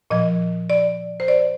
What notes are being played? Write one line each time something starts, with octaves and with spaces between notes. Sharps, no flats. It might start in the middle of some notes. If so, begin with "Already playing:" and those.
A#2 F3 D#5
D5
C5
D5